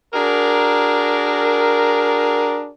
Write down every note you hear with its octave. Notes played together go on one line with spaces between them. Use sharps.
D4 F#4 G#4 A#4